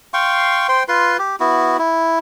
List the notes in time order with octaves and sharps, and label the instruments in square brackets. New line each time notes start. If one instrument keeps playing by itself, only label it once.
[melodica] F5 G5 C6 C#6
C5 G5 C6
F4 B4 C6
G4
B3 E4 F#4
E4